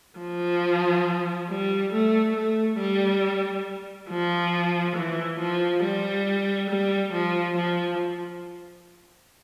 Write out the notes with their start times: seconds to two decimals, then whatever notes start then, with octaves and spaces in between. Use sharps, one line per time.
0.19 F3
1.50 G3
1.93 A3
2.36 A3
2.80 G3
4.09 F3
4.96 E3
5.39 F3
5.83 G3
6.70 G3
7.13 F3
7.56 F3